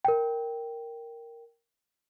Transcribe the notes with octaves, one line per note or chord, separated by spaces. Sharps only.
A#4 G5